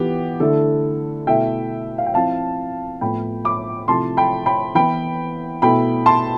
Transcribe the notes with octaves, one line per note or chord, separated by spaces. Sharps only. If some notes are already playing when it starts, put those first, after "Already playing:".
Already playing: E3 B3 F4 G4
D3 A3 E4 A4
B2 A3 E4 E5 G5
F5
G5
F3 C4 E4 F5 A5
A2 F3 B3 G5 B5
B5 D6
C3 F3 A3 E4 A5 C6
G5 B5
G5 B5
E3 B3 E4 G5 B5
B2 A3 E4 G5 B5
A5 C6